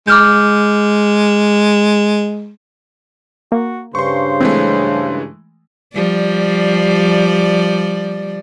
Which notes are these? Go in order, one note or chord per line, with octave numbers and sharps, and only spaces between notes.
G#3 D6 F6 G6
A#3 F#4
G2 C#3 C5 C6 C#6
E3 G#3 A3 C4
F3 G3 D5